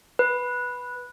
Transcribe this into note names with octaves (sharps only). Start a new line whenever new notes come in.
B4